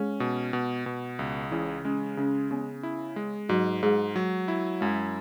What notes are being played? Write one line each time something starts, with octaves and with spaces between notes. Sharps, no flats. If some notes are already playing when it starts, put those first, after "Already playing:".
Already playing: G#3 C#4 G#4
B2
B2
B2
C#2
C#3 E3 E4
G#3 C#4
C#3 C#4
C#3 B3
E4
G#3
G#2 F#3 F#4
G#2 G#3 G#4
F#3
E4
F#2 G#3